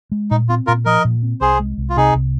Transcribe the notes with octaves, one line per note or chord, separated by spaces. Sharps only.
G#3
A#2 D#4
C4 F4
A#2 F4 A#4
F3 A#4 D#5
A#2
C4
C2 G#4 C5
G#3
C2
F4
C3 D#4 G#4
C2